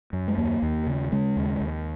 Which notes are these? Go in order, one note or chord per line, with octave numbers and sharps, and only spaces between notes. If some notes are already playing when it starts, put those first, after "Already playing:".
F#2
G#3
D#2 A#3
D#2
C#3
C#3 G#3
D#2
D#2